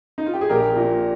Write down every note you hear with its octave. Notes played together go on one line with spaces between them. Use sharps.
D#4
F4
G4
G#4
A#1 G4 A#4
A#2